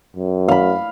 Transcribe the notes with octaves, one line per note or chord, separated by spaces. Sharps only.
F#2
F5 B5